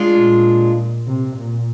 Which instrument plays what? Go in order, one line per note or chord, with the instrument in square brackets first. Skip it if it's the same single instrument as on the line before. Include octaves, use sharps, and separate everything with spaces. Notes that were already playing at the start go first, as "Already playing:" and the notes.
Already playing: [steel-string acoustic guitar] G#3 D4 F4
[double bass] A#2
C3
A#2